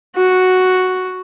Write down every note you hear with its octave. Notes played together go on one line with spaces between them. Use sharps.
F#4